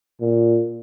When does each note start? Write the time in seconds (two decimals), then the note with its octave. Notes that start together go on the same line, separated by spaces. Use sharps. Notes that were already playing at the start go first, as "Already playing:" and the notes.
0.21 A#2